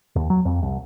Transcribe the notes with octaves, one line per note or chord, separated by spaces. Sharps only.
D#2
F#3
F2
C2